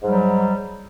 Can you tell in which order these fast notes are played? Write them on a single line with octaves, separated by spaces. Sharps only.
G#2 G3 F#3